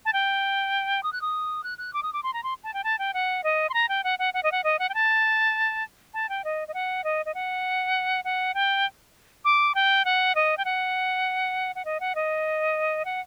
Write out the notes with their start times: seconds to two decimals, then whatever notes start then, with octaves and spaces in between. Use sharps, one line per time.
0.05 A5
0.13 G5
1.03 D#6
1.13 F#6
1.21 D#6
1.64 F#6
1.78 F#6
1.93 D6
2.03 D#6
2.13 D6
2.23 C6
2.33 A#5
2.43 C6
2.64 A5
2.74 G5
2.84 A5
2.99 G5
3.14 F#5
3.44 D#5
3.69 C6
3.74 A#5
3.89 G5
4.04 F#5
4.19 F#5
4.34 F#5
4.43 D#5
4.52 F#5
4.64 D#5
4.79 F#5
4.89 G5
4.94 A5
6.14 A5
6.29 G5
6.44 D#5
6.68 D#5
6.74 F#5
7.04 D#5
7.26 D#5
7.34 F#5
8.25 F#5
8.54 G5
9.45 D6
9.75 G5
10.05 F#5
10.35 D#5
10.57 G5
10.65 F#5
11.75 F#5
11.85 D#5
12.00 F#5
12.15 D#5
13.05 F#5